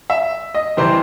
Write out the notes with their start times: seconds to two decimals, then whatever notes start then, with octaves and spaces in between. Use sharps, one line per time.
0.10 E5
0.55 D#5
0.77 C3 E3 G3 C4 C5